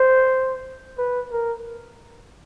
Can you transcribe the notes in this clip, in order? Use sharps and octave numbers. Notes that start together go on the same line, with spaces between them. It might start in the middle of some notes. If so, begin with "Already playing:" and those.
Already playing: C5
B4
A#4